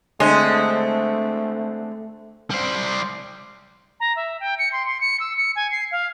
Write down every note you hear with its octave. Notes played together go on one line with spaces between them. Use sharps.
D3 G#3 A3 C4 D#5
G3 C5
A#5
E5
G5
C#7
C6
C6
C#7
E6
C#7
G#5
C7
F5